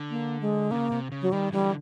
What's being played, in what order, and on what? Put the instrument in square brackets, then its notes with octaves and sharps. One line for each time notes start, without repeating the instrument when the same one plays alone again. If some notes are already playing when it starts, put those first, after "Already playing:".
Already playing: [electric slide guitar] D3
[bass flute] A#3
G#3
[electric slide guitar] C#3 [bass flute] A#3
[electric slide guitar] C3
C#3
[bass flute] F#3
[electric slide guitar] D#3 [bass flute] G3
[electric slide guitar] D3 E3 [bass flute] G3